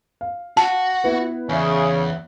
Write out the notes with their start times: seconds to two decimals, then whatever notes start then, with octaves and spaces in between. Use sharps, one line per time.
0.21 F5
0.57 F#4 A5
1.04 B3 E4 B4
1.49 E2 C#3 C#5 D5 E5